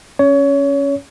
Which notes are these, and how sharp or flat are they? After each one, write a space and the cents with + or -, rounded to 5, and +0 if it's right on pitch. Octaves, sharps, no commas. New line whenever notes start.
C#4 +0 C#5 +25